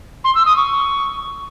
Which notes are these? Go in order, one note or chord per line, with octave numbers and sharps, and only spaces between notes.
C6
E6
D#6
C#6